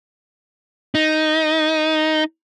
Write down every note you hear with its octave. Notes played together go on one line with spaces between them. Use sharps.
D#4